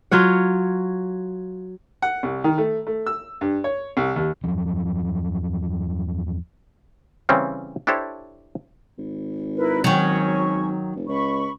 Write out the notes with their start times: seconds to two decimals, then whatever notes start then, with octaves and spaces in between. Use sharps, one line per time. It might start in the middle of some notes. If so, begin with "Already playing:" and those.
0.12 F#3 F4 C#5 F#5
2.02 F#5
2.23 C2
2.44 D#3
2.58 A3
2.87 A3
3.06 E6
3.41 G2
3.64 C#5
3.97 C2
4.16 D#2
4.43 E2 G2 F3 F#3
7.29 C#3 E3 G3 C4 C#4
7.87 D4 E4 G4 A4 C5 C#5
8.98 G#1
9.56 E4 A#4 B4
9.84 D#3 F#3 C#4 C#6
10.95 F1
11.08 C#2 B5 C#6